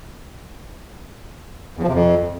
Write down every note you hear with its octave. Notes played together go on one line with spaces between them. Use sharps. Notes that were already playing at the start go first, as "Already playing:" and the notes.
E2
F3
C3
F2